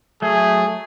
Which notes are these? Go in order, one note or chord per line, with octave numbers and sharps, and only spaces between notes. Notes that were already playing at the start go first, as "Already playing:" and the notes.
F#3 A3 G#4